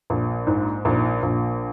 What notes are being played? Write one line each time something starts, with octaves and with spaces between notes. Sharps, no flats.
A#1
G#2
A#1
A#1